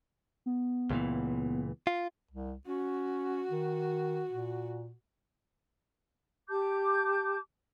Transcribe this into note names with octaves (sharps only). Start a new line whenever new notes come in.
B3
C#2 A#2 E3
F4
C2
C#4 F#4
D#3
A#2
G4 A5 D6 G6